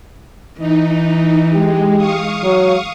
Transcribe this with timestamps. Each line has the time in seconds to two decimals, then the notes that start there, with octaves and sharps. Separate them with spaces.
0.58 E3 D#4
1.54 G#3 G4
1.97 F5 C#6 D#6
2.44 F#3